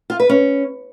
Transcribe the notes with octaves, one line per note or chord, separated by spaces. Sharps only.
F4
B4
C#4